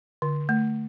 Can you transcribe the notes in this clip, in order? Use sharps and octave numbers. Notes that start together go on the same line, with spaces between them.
D3
A3